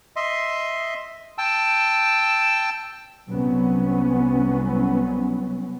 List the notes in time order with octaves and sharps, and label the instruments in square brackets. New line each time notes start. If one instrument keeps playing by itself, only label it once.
[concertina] D#5 E5 C6
G5 A5 E6
[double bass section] C2 F#3 B3 C#4